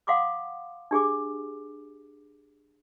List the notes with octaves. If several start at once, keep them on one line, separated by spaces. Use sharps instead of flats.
F5 F#5 C6 D6 D#6
D4 G4 G#4 D6